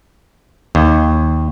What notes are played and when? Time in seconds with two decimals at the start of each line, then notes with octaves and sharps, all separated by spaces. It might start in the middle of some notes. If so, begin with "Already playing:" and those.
0.75 D#2